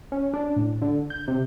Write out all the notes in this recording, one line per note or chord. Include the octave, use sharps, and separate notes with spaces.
C#4
D4
A2
D3
G6
C3